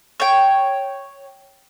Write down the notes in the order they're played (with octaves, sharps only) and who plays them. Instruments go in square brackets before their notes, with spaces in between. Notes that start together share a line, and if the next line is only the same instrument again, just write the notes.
[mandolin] C#5 G5